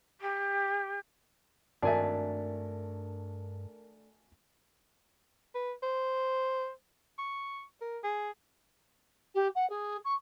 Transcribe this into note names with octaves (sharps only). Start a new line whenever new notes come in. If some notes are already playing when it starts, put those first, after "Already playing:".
G4
G#1 G2 A3 D4 A#4 G#5 A5
B4
C5
C#6
A#4
G#4
G4
F#5
G#4
C#6